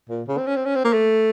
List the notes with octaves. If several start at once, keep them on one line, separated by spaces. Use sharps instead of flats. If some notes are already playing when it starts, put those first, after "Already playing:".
A#2
C#3
C4
C#4
C4
C#4
C4
A#3
A3